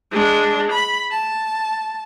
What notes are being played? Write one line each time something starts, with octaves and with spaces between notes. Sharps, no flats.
G#3 D4
B5
A5